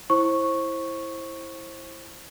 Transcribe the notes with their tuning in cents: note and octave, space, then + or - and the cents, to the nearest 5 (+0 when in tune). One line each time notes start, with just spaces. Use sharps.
E4 +0 C5 +25 C#6 -5